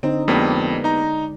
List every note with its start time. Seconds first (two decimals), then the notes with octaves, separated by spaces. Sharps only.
0.03 D3 C4 D#4
0.28 F2 G#3 A#3 B3 G4 D5
0.84 D#4 A#5